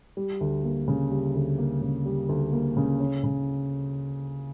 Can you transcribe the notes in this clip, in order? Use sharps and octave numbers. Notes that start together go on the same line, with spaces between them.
G3
D2
A#3
C#3
G3
D2
A#3
C#3
G3
D2
A#3
C#3
C#4
C#3